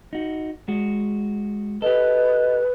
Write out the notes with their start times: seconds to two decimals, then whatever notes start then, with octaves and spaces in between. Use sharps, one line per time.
0.13 D#4 F#4
0.68 G#3 F#4
1.82 G4 A4 B4 D#5